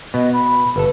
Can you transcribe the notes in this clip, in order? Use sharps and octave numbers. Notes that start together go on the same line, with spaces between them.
B2 B3 D#5
B5
G1 A4 B4